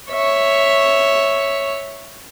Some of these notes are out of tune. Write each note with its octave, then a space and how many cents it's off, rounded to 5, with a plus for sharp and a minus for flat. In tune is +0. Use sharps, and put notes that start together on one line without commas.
C#5 +0 E5 +0